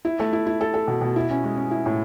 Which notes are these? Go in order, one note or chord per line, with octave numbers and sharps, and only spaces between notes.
E4
A3
E4
E4
A4
A4
B2
B2
E4
C#4
G#3
C#4
E4
A2